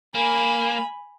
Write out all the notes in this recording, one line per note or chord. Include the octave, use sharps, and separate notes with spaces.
A#3 G#5 B5